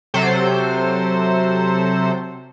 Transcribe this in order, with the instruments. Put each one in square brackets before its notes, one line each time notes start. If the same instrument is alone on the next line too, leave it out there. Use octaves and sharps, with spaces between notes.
[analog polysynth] C3 F#3 A4 C5